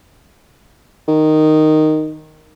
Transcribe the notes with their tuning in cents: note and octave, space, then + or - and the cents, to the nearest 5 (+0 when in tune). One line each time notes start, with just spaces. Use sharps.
D#3 -5